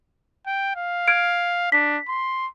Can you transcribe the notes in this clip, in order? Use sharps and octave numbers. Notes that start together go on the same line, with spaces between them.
G5
F5
F6 G#6 D7
D4 B6
C6